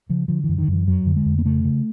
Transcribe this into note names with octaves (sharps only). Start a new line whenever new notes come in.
C#3 F3
D3 F3
F#2 E3
D#3
F#2 E3
F2 F#3
D3
G#3
F2
A#3
C#3 A3
C#3